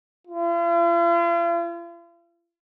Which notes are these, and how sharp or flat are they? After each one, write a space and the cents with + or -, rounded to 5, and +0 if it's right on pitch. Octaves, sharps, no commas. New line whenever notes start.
F4 -45